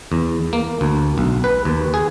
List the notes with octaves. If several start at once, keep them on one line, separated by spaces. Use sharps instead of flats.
E2
A#3
D2
B1
B4
D#2
G#4